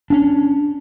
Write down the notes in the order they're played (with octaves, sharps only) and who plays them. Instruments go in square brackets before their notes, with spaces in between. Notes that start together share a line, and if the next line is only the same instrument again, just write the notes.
[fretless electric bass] C#4 D4